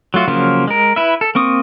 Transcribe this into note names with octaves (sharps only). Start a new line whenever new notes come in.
F#3 A3 F4 F#4
C#3 F3 F#3 A#3 F4
G#3 A#4
E4 B4 E5
A4
A#3 C4 C#6 D#6